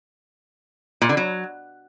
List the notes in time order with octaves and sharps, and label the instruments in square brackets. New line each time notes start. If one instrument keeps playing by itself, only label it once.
[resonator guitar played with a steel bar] A#2
D3
F#3